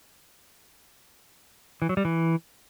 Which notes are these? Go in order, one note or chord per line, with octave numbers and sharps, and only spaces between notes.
E3
F#3
G3
E3